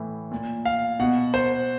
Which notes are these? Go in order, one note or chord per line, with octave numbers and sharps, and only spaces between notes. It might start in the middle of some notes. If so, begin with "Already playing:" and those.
Already playing: A2 E3
A#2
F5
B2 F#5
C5